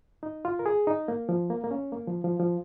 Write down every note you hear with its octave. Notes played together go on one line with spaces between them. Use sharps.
D#4
F4
A#4
G#4
D#4
A#3
F3
A#3
A#3
C#4
A#3
F3
F3
F3